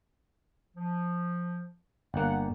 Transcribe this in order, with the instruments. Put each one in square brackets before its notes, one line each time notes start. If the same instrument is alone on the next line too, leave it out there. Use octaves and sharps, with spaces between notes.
[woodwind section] F3
[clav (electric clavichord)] G1 A#3 [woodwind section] F#5